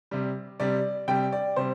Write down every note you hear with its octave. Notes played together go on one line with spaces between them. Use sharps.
C3 G3
C3 G3 D5
C3 G3 G5
D5
C3 G3 C5